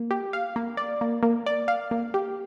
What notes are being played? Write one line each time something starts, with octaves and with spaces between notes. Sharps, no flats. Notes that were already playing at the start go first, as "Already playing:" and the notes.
Already playing: A#3
G4
F5
A#3
D5
A#3
A#3
D5
F5
A#3
G4